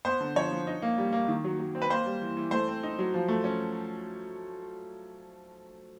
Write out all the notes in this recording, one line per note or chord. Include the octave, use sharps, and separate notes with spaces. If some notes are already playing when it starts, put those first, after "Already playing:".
B3 C5
D3
F3 C#5
F3
D#4
A#3
G3
A#3
D#3
F#3
F#3
C4
B4
A#3 C5
G3
E3
E3
A3 C5
C4
D#4
F#3
F3
A3
C#4